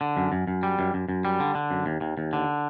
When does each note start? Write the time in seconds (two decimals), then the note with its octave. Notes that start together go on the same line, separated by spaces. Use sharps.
0.01 D3
0.17 F#2
0.32 F#2
0.47 F#2
0.63 G3
0.79 F#2
0.94 F#2
1.09 F#2
1.25 G3
1.40 D3
1.55 D3
1.71 F#2
1.86 D#2
2.01 D#2
2.17 D#2
2.33 D3